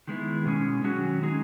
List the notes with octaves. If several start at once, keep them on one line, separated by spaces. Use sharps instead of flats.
D#3 G#3 B3 E4
B2 G#3 C#4 G#4
D#3 F#3 C#4 F#4
G#3 D#4 G#4